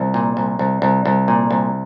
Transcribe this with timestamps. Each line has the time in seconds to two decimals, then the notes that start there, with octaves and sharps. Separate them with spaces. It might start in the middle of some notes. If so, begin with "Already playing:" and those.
Already playing: C2
0.14 A#2
0.37 C2
0.59 C2
0.82 C2
1.06 C2
1.28 A#2
1.51 C2